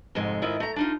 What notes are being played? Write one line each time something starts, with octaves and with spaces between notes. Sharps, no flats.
F2 G#2 C3 G#3
G#2 D#3 E4 F4 D#5
A3 A#5
D4 D#4 F4